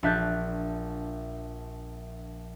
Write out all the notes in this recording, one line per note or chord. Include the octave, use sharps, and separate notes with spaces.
A#1 D4 E5 F#6 G6 A6